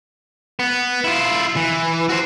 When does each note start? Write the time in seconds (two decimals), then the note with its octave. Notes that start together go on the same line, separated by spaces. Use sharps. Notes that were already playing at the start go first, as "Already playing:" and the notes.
0.59 B3
1.04 E4 F4
1.56 E3
2.09 F#4 C5